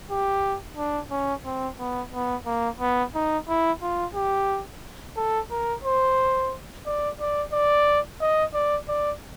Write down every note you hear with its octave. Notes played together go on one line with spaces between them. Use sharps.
G4
D4
C#4
C4
B3
B3
A#3
B3
D#4
E4
F4
G4
A4
A#4
C5
D5
D5
D5
D#5
D5
D5